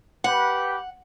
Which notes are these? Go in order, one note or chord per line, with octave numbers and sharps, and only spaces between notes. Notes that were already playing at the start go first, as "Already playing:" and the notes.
G4 B4 F#5